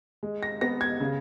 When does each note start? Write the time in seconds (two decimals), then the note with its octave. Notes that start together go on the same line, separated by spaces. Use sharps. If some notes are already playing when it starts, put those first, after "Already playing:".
0.23 G#3
0.43 A#6
0.61 B3 A#6
0.81 G#6
1.00 C#3